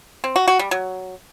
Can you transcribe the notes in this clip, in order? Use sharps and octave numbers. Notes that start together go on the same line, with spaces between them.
C4
F#4
F#4
G3
F#3